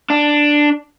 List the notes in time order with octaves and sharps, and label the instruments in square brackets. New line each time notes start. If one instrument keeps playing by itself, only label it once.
[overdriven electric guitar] D4